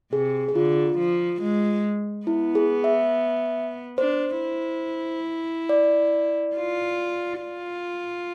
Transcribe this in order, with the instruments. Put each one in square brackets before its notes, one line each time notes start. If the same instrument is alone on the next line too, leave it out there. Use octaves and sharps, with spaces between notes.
[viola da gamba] C3 [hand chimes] G#4
[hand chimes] G#4
[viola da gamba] D3 [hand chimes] F4
[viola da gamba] F3
G#3
[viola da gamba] B3 [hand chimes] E4
[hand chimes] G#4
E5
[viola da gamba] D4 [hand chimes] C5
[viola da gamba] E4
[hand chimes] D5
[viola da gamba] F4
F4